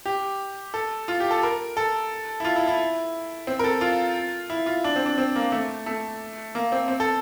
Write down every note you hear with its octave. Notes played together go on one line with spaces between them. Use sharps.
G4
A4
F4
G4
A4
A#4
A4
E4
F4
E4
E4
C4
A#4
A4
F4
E4
F4
D4
C4
D4
C4
A#3
A3
A3
A#3
C4
C4
A4